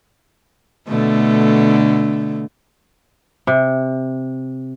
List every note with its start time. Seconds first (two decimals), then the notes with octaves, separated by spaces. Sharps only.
0.88 B2 D3 A3
3.47 C3